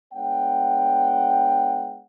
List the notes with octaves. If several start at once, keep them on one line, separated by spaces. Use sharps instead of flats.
G#3 B3 D4 C#5 F#5 G5